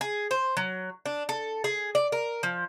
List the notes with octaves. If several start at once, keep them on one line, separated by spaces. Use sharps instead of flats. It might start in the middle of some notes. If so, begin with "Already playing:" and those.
G#4
C5
F#3
D4
A4
G#4
D5
A#4
F3